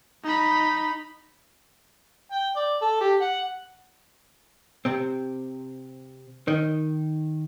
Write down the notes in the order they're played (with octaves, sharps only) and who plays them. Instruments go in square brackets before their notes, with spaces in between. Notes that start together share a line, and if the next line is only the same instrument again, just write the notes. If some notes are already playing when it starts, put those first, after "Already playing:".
[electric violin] D#4 B5
[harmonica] G5
D5
A4
G4
F#5
[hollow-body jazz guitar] C3 C4
D#3